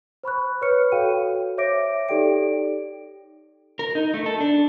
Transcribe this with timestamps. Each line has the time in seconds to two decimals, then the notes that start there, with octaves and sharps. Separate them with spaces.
0.24 C5 B5 C#6 F#6
0.62 B4 C#5 B5 C#6 F6 C#7
0.92 F#4 A4 C#5 F5 G5 D#7
1.58 C5 C#5 E5 D6 A#6 D7
2.09 D#4 G4 A4 D5 G5 D7
3.79 A#4
3.95 D#4
4.14 A3
4.26 A4
4.41 D4